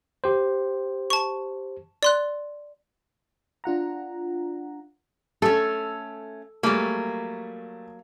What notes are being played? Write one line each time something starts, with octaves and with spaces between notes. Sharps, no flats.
G4 C5
A5 C#6
D5 C6 F#6
D4 F4 F#5 A#5
A3 C#4 A4
F#3 G3 A3 A#3 G#4